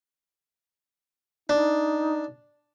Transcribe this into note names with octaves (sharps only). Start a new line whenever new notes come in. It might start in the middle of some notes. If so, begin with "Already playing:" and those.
D4 D#4